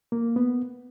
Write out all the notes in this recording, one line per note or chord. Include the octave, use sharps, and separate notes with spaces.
A#3
B3